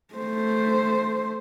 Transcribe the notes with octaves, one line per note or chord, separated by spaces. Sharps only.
A3 C5